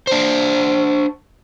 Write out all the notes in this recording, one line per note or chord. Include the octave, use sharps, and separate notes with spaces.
D4 C5